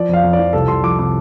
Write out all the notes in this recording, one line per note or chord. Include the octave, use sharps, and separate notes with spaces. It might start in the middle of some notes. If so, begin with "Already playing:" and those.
Already playing: F3 D5
F2 F5
F2
D5
F3
C2 A4
C2 C6
F3 D6
C3 D6